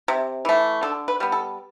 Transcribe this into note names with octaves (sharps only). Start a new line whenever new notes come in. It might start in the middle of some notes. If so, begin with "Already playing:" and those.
C3
E3 A3
D3 A4
B4
G3 B3
A4